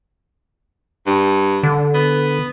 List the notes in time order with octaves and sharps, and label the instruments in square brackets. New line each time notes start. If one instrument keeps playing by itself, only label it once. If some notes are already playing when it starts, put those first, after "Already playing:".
[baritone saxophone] G2
[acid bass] D3
[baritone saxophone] B3